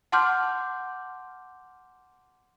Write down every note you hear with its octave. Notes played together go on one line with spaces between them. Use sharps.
F#5 A5 C6 D6 F6 G6